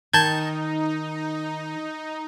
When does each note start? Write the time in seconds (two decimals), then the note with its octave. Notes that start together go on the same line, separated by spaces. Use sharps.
0.13 D#3 D#4 A5 G6 G#6